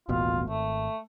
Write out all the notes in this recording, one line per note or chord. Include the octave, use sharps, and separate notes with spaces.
D#1 A1 B2 F4
G#1 A3